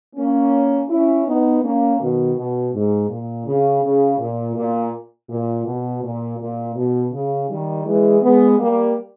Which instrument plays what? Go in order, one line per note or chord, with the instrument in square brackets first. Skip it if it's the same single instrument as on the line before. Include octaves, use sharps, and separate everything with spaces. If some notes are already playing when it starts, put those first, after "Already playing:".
[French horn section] A#3 C#4
C#4 E4
B3 D#4
A#3 C#4
B2 D#3
B2
G#2
A#2
C#3
C#3
A#2
A#2
A#2
B2
A#2
A#2
B2
C#3
D#3 G3
E3 G#3
G#3 B3
G3 A#3